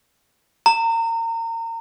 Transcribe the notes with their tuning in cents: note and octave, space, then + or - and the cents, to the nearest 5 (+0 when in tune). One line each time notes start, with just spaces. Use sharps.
A#5 -30